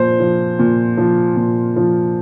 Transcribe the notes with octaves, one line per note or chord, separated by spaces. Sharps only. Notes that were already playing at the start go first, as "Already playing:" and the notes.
Already playing: A#2 F3 C5
F3
A#2
F3
A#2
F3